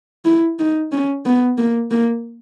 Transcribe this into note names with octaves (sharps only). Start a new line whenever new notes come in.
E4
D#4
C#4
B3
A#3
A#3